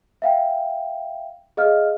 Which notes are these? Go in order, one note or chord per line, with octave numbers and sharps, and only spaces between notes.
E5 F5 G5
G#4 D#5 F5 F6